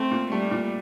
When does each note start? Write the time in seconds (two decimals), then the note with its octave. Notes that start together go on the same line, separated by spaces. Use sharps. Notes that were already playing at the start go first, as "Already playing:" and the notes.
Already playing: A3 C4
0.11 A#2
0.31 G3 A3
0.51 A#2